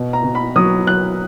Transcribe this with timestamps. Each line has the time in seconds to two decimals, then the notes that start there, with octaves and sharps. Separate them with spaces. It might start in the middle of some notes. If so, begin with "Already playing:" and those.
Already playing: B2
0.13 A#5
0.24 B2
0.35 B5
0.56 F#3 D#6
0.87 F#3 F#6